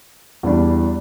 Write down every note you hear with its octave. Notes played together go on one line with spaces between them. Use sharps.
E2 E3 G3 D4